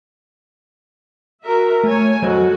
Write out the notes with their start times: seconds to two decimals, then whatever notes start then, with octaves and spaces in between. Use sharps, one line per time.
1.43 F#4 A#4 E5
1.84 A3 C#5 G#5
2.22 F#3 F#4 A4 C5 D#5